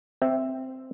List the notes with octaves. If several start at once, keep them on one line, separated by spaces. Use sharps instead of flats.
C4 E5